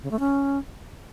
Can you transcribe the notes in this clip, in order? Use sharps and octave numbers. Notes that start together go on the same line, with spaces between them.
C#3
A3
C#4